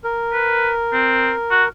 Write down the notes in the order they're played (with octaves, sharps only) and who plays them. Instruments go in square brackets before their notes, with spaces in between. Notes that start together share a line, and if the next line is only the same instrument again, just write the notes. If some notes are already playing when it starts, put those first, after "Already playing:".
[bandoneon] A#4
[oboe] B4
C4
F#4